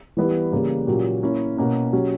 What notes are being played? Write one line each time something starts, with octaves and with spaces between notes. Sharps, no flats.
E3 G3 B3 E4
C#3 E3 G3 A#3
A#2 F#3 C#4 G4
A#3 C#4 E4
B2 A#3 C#4
F#3 C#4 G4